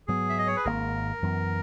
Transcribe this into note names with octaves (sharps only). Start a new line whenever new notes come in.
G#2 F#3 B3 G#4
E5
D#5
C#5
B4
G#1 G#2 D#3 A#3 A#4
F#2 E3 B3